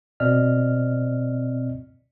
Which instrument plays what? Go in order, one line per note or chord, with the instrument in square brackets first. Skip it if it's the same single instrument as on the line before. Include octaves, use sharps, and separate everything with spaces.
[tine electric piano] B2 C4 D5 D#5 F6